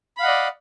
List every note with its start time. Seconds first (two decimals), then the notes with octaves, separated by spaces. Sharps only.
0.17 B5
0.20 F5
0.22 F#5
0.25 D#5
0.28 D5